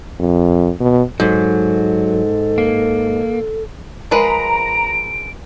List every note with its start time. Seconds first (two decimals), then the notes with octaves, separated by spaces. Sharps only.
0.20 F2
0.80 B2
1.20 G#2 F#3 A4
2.58 A#3
4.11 F3 G#3 A#4 B4 A#5 D7